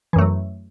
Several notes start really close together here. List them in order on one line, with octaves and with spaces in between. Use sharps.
E3 F#2 A3 F#3